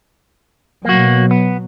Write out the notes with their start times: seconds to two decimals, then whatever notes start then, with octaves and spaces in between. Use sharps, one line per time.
0.85 B2 F#3 A#3 F#4
1.31 B3